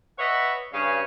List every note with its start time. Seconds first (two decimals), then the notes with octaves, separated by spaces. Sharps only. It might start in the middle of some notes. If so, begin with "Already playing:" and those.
0.19 B4 C#5 D#5 E5 F#5 B5
0.73 G2 C#3 C#4 C#5 F5